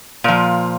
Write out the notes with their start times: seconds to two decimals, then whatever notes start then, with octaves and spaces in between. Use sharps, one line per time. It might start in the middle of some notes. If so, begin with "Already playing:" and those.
0.24 A#2 F3